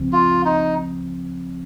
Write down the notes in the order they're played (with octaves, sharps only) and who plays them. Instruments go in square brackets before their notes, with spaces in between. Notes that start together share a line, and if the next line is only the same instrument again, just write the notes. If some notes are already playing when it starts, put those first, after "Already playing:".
Already playing: [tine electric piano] C#2 C#3 F3 C4
[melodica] F4
D#4